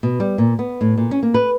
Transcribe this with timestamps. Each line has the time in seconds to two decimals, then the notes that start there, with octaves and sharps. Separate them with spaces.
0.03 B2
0.20 G3
0.38 A#2
0.59 B3
0.81 A2
0.97 A#2
1.11 C#4
1.23 A#3
1.34 B4